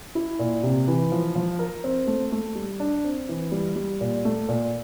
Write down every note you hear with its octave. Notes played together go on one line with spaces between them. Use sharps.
E4
A#2
C3
E3
F3
F3
A#4
C4
A3
A3
G3
D4
C4
E3
G3
G3
A#2
A3
A#2